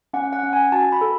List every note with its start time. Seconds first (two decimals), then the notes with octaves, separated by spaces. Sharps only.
0.13 C#4 F#5
0.33 F#5
0.43 C#4
0.53 G#5
0.72 F#4 A5
0.92 B5
1.01 A4